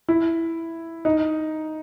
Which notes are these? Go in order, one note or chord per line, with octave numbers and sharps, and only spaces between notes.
E4
D#4